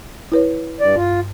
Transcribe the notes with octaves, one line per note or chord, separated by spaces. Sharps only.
E4 B4 C#5
G2 D5
G2 F4